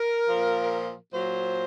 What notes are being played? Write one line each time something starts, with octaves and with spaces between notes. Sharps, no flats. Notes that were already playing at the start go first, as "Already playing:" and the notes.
Already playing: A#4
A#2 F3
A#2 F#3 C5